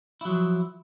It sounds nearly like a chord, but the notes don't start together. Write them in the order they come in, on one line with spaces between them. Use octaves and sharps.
E4 F#3 F3